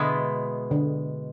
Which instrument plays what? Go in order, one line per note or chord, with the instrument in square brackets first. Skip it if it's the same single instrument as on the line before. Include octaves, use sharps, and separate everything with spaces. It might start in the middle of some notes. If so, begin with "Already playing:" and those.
Already playing: [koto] B2 G#3 B3 E4 [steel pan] D3
[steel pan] D3